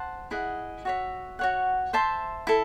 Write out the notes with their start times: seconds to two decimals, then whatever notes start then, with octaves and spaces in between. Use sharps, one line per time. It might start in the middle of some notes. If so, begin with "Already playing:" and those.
Already playing: C5 F#5 A5
0.31 E4 G#4 D#5 F#5
0.85 F#4 C#5 E5
1.39 F#4 C#5 F#5
1.93 C5 E5 A5 C6
2.47 E4 A4